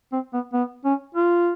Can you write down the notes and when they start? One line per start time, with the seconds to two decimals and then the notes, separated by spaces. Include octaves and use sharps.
0.13 C4
0.33 B3
0.54 B3
0.85 C#4
1.15 F4